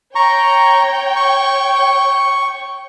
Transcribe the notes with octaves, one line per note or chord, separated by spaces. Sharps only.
C#5 G5 A#5 C#6
C#6